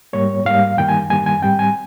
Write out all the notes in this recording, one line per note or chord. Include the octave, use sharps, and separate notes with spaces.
G#2 G3 A#3 C#5
G#2 G3 A#3 F5
G2 D#3 G3 A#3 G5
G#5
G2 D#3 G3 A#3 G#5
G#5
G#2 G3 C4 G5
G#5